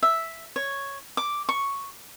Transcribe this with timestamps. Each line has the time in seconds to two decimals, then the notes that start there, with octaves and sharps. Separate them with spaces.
0.03 E5
0.56 C#5
1.17 D6
1.49 C#6